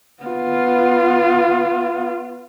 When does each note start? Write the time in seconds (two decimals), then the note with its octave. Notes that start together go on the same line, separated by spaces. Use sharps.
0.23 B3 F4